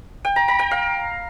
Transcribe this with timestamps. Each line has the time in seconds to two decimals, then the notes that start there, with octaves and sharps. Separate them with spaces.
0.25 G5
0.36 A#5
0.48 A#5
0.59 G5
0.71 F5